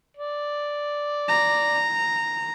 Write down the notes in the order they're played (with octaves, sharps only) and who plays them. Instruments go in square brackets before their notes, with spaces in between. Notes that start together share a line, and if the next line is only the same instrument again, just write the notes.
[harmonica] D5
[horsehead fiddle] A#5